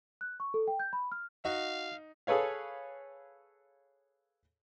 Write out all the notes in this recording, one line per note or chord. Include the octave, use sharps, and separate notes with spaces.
F#6
C#6
A4
G5
G6
B5
F6
D#4 F#4 F5
G#4 A4 B4 C#5 F5